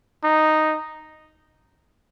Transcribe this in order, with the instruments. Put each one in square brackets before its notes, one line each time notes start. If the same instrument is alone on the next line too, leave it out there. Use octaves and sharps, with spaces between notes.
[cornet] D#4